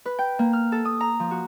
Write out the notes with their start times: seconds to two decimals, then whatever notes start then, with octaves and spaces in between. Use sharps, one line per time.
0.06 B4
0.19 G5
0.39 A#3
0.53 F6
0.72 A4
0.85 D#6
1.00 A#5
1.20 F3
1.31 F#4